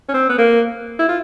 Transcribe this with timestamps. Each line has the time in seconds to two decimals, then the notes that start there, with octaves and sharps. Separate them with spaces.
0.09 C#4
0.14 C4
0.29 B3
0.38 A#3
0.99 E4
1.08 F4